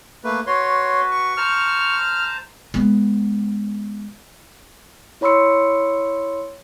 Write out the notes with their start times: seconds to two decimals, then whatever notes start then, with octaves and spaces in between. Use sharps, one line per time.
0.24 A3 A#3 B4
0.47 F#4 B4 C#5 C6
1.11 C#6
1.37 C5 A5 A#5 F6
2.74 G#3 B3
5.21 E4 C#5 B5 C6 E6 C#7